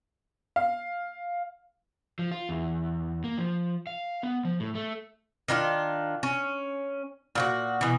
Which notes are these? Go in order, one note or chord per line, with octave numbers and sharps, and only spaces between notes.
F5
F3
F4
E2
A#3
F3
F5
B3
F3
A2
A3
D#3 D4 E4 F4
C#4
A#2 F4 F#4
B2 E3